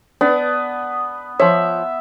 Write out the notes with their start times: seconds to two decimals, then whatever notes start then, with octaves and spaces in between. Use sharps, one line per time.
0.21 B3 D4
1.40 F3 C#5 E5